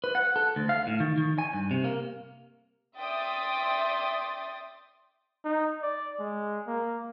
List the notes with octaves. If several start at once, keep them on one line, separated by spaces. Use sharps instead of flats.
B4
F#5
A4
D2
F5
A2
D#3
D#3
G#5
G2
C3
A#3
D5 E5 G5 C6 D#6 A6
D#4
D5
G#3
A#3